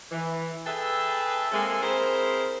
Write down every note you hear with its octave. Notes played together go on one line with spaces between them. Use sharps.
E3
G#4 A4 B4 E5 G5 A5
G#3 A#3 C4 G#4 A4
C4 E4 G#4 A#4 C5